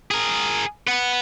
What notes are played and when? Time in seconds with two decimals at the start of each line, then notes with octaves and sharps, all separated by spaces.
0.11 G#4 A#4
0.87 B4 F#5